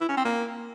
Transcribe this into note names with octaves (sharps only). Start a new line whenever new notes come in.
E4
C#4
C4
A#3